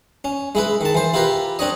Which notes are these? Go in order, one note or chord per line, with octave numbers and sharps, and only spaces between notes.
C#4
G#3 E4 B4
D#3 A5
E3 C5
E4 F4 G4 A#4 B4
C4 D4 C#5 D#5